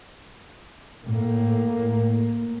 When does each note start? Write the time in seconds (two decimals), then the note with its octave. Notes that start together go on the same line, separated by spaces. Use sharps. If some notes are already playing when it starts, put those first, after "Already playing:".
1.05 A2 A#3